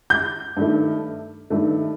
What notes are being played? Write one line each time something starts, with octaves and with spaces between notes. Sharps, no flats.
G6
G2 D#3 A3
G2 D#3 A3